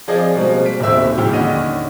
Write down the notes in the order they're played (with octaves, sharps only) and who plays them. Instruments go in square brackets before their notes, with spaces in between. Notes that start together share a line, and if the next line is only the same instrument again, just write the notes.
[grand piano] F3 C4 F4 G#4 D5 D#5
B2 G3 G#3 A#3 C4
B6 D7
D#1 D#2 B2 C4 E5 E6
A#2 C#3 G5 F6
D#2 D3 C#4 D#5 D#7